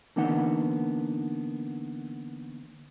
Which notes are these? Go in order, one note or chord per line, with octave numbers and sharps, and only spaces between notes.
D3 E3 A#3 B3 D#4 F#5